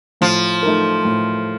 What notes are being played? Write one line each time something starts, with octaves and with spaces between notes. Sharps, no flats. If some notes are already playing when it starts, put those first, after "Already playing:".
A2 F3
A3 D#4 A#4
A2